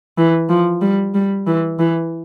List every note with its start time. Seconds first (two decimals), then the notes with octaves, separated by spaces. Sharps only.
0.18 E3
0.50 F3
0.82 G3
1.15 G3
1.47 E3
1.79 E3